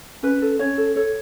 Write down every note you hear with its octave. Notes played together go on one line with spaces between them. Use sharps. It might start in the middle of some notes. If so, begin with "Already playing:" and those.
C#4 B4
A4
C#4 C#5
A4
A4 C#5